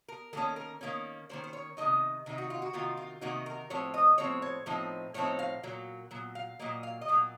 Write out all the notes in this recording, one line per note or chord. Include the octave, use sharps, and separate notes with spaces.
A#4
D#3 A#3 C#4 A4
A#4
D#3 A#3 C#4
D#3 A#3 C#4 C5
C5
C#5
C3 D#3 A#3 D#4 D#5
C3 D#3 D#4
F#4
F4
F#4
C3 D#3 A#3 D#4 F4
F4
C3 D#3 A#3 D#4 F#4
A#4
A2 F3 C4 C#5
D#5
A2 F3 C4 C#5
C#5
A2 F3 C4 D#4
A2 F3 C4 D#4 C#5
F5
A#2 F#3 A#3
A#2 F#3
F5
A#2 F#3 A#3 D#5
F5
D#5
A#2 F#3 A#3